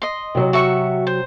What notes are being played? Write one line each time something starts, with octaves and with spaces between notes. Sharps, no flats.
D#5 C6
C3 F#3
F#4 E5 C#6
C5